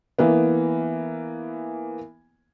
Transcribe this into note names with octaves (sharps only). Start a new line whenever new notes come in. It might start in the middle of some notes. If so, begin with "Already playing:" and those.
E3 A#3 B3